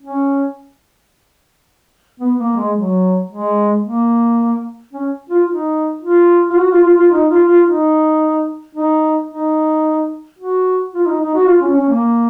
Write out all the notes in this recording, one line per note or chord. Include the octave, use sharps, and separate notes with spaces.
C#4
B3
A#3
G#3
F#3
G#3
A#3
C#4
F4
D#4
F4
F4
F#4
F4
F4
F4
D#4
F4
F4
D#4
D#4
D#4
F#4
F4
D#4
D#4
F#4
F4
C#4
C#4
A#3